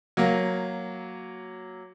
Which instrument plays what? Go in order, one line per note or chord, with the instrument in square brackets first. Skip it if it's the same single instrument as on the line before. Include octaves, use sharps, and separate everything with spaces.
[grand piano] F#3 A#3